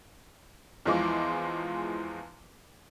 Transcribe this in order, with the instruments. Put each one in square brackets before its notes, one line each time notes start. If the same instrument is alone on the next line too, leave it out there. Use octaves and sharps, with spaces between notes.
[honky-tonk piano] E2 E3 F3 G#3 C6 D6